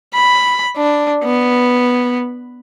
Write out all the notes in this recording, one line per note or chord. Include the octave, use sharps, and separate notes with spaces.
B5
D4
B3